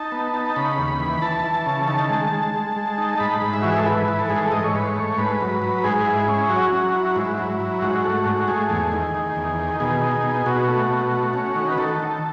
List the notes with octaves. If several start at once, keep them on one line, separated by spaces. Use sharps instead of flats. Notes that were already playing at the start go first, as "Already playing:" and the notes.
Already playing: D#4 A5
B3
D#4
A5
C#3 B5
D#2
E3
E3 A5
E3
C#3
D#3 A5
G#3
G#3
G#3
G#3
D#4
G#2 B5
G#2
E5
E3 F#4
G#4
A4
E3 B4
E3
A4
G#2 G#4
A4
G#2 D#5
C#5
G#2 B4
C#5
A3
G#2 B4
F#3
F#3
G#2 G#4
E4
C#4
F#3 F#4
F#3
E4
G#2 E4
F#3
F#3
G#2 F#4
A3
G#2
A3 G#4
E2
D#3
D#3
E2
D#3
B2 G#4
D#4
B2
B2 F#4
A3
B2
A3
C#4
D#3
B4
D#3 A4
D#3